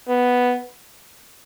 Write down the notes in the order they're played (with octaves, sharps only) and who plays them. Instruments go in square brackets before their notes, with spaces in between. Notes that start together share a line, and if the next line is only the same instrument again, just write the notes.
[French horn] B3